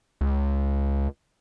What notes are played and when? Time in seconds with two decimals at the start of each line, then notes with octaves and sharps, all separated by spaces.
0.21 C#2